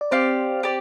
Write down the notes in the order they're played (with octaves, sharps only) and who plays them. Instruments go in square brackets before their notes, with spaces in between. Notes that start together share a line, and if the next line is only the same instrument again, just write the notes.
[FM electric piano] D5
[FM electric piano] C4 C5 [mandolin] G4 D5 F5
[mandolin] G4 D5